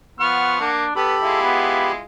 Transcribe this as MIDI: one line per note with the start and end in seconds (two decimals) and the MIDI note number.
0.20 0.60 53
0.20 0.56 59
0.20 0.71 78
0.20 0.60 85
0.20 0.60 89
0.60 0.85 58
0.60 0.92 62
0.96 1.15 59
0.96 1.92 67
0.96 1.41 69
0.96 1.92 83
1.21 2.05 56
1.21 2.05 64
1.21 2.05 65
1.42 1.89 59